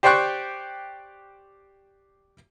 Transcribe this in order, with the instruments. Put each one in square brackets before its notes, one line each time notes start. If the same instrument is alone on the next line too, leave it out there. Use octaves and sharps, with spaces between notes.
[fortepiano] G4 C5 D5 G5 C#6 F#6